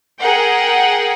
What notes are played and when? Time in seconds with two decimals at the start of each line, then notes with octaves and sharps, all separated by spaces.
0.21 G#4 A#4 F#5 G5